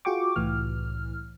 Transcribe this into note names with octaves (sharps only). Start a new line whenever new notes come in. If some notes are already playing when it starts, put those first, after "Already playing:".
F4 F#4 G#4 G5 C#6 D6
C2 A2 E3 F6